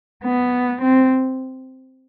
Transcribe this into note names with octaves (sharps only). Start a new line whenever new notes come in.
B3
C4